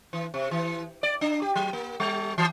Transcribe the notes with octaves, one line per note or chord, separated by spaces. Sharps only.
E3
C3
E3
D5
D4
G4
F#3
A#3
G3
E3